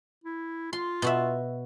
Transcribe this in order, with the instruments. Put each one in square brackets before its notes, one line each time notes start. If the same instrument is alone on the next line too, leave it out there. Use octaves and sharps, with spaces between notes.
[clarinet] E4
[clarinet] F4 [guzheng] C6
[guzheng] B2 F#4 E5